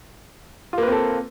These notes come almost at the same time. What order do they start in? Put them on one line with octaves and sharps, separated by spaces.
F4 A#3 B4 C4 A4